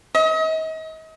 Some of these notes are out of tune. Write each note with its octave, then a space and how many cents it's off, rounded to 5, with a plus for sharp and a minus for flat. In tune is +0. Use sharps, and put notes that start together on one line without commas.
D#5 +40